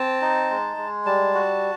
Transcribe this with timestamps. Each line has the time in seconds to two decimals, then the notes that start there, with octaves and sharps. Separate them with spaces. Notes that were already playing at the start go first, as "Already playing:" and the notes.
Already playing: C4 A5
0.22 D#4
0.50 G#3
0.77 G#3
1.05 G3 A5
1.34 F#4